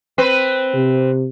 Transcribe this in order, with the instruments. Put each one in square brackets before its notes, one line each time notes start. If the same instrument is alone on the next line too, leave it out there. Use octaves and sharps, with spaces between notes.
[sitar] C4 B4
[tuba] C3